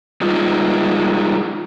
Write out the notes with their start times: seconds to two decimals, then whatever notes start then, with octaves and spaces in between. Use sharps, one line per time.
0.21 G3 G#3 D#4 F4